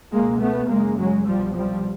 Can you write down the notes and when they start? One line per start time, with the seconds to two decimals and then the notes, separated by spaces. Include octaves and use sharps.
0.12 C#2 B2 G#3 A#3
0.41 A3 B3
0.69 F#2 C#3 G#3 A#3
0.98 F#3 G#3
1.27 C2 B2 F3 G3
1.55 F3 G3